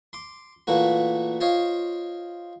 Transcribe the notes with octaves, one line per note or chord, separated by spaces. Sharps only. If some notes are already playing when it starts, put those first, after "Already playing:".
C6 D6
A#2 E3 A3 A#3 F#4
F4 C5 C#5 D#5 F5